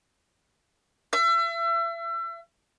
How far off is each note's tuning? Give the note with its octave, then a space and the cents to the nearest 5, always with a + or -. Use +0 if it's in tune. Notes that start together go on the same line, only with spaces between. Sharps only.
E5 +35